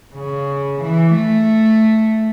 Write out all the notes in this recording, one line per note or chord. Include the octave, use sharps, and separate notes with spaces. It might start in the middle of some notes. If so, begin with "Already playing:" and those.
C#3
E3
A3